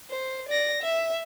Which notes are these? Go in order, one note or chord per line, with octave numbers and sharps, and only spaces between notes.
C5
D5 A#6
E5